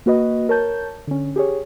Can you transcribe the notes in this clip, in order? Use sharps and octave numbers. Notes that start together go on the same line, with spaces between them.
A#3 F#4 B4 D#5
A#4 C#5 A5 G6
D3 C#4
G4 G#4 C#5